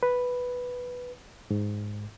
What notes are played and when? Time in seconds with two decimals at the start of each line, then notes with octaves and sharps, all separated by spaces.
0.03 B4
1.51 G#2